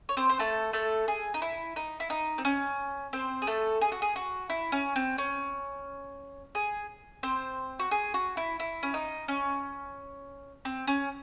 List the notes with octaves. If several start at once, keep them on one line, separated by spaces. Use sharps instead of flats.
C#5
C4 C5
C5
A3 A4
A3 A4
G#4
D#4
E4
D#4
E4
D#4
C4
C#4
C4 C5
G#4
A3 A4
G#4
F#4
G#4
F#4
E4
C#4
C4
C#4
G#4
C4 C5
F#4
G#4
F#4
E4
E4
C#4
D#4
C#4
C4
C#4